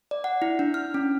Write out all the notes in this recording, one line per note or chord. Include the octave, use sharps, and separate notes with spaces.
D5
F#5
E4
D4
F6
C#4